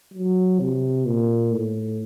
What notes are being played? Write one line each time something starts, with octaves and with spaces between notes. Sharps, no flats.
F#3
C3
A#2
A2